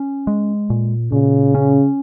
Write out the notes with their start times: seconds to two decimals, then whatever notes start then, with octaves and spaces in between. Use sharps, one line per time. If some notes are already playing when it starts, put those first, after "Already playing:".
Already playing: C#4
0.27 G#3
0.70 A#2
1.12 A#2 C#3
1.55 C#4